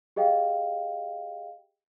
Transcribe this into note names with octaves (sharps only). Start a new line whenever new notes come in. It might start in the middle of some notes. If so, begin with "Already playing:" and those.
G4 G#4 D#5 F5 G5